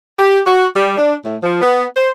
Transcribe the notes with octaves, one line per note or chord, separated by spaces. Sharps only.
G4
F#4
G3
D4
A2
F3
B3
C5